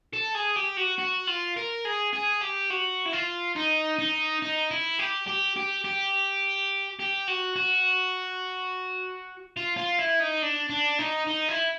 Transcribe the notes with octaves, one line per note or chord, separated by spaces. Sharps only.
A4
G#4
G4
F#4
F#4
F4
A#4
G#4
G#4
G4
F#4
E4
F4
D#4
D#4
D#4
E4
G4
G4
G4
G4
G4
F#4
F#4
F4
F4
E4
D#4
D4
D4
D#4
D#4
E4